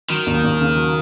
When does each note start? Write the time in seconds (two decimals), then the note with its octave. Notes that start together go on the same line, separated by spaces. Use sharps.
0.10 D#3 F#3
0.27 D#2
0.44 D#2
0.60 C#3
0.77 F#3